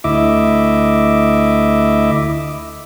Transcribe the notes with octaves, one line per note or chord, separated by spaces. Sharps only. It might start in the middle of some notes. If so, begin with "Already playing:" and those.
D2 E4 D#5 E5 D6